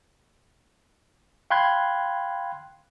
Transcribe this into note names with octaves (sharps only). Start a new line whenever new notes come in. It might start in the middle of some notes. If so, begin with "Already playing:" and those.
F5 G5 B5 C6 F#6 G#6